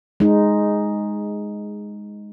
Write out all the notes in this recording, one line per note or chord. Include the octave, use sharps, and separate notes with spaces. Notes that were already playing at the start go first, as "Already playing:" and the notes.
G#3 D#4